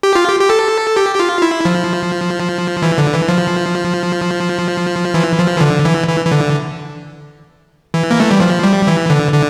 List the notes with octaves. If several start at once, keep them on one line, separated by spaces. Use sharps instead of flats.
G4
F4
G4
G4
A4
G4
G4
F4
E4
F3
E3
D3
E3
F3
E3
F3
E3
D3
E3
E3
E3
D3
E3
A#3
A3
G3
F3
G3
E3
D3
D3